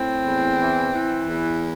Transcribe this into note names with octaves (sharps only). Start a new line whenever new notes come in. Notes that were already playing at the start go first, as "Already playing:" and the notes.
Already playing: A2 C4
E2
E3
E3
E2